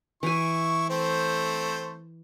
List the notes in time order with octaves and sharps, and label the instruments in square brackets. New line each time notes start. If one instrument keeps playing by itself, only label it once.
[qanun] E3 G#5 [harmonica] E4 C#6
[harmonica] A3 C4 C5